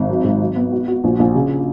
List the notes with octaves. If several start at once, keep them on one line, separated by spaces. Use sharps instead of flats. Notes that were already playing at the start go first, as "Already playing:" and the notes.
Already playing: G#1
F#3
G#2
F#3
B3
F#4
F#4
A#1
A#1
C#3